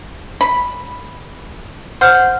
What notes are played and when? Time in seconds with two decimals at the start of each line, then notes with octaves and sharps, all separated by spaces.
0.41 B5
2.01 C5 F#5 F6 G6